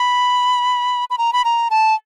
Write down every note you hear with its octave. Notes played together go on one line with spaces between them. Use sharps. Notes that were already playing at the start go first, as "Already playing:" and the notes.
Already playing: B5
B5
A#5
B5
A#5
A5